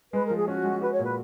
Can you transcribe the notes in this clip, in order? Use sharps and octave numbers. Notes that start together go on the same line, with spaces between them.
G#3 B4
F3 A#4
G#4
C#4 F#4
G#3
F#4 B4
C#5
A#2
B4